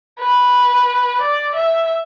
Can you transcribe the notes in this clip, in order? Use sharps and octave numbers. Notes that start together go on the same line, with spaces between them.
B4
D5
E5